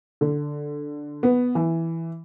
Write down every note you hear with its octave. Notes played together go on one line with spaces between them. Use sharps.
D3
B3
E3